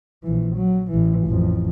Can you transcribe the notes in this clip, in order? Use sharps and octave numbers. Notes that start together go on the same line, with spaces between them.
A#1 E3
F#3
A1 E3
A1 F2